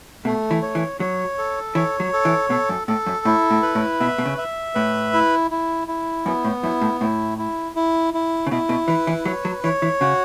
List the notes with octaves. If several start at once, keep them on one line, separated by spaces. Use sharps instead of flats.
B2 A3
E3
C#5
E3
F#3 C#5
A4
E3 C#5
F#3
A4
E3
B2 A4
F#2
A2 A4
F#2
A2 E4
A2
B4
A2
B2 E5
B2
C#3
E5
A2 B4
E4
E4
E4
F#2 B3
A2
F#2 E4
A2
A2 E4
E4
E4
E4
C#3
B2 E4
B2
E3 B4
E3
F#3 C#5
F#3
E3 C#5
E3
C#3 F#4